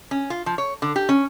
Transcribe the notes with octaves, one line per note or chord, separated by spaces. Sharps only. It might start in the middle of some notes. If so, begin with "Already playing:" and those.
C#4
F4
F3
C#5
D3
G4
C#4